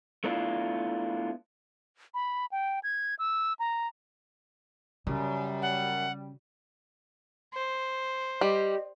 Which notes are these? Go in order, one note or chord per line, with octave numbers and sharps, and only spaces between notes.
A3 B3 D4 E4 F4
B5
G5
G#6
E6
A#5
F#2 C#3 G3
F#5
C5
G3 G4 D#5